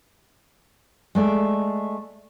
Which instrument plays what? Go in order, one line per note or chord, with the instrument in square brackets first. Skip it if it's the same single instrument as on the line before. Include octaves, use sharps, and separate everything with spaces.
[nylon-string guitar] G#3 A3 D5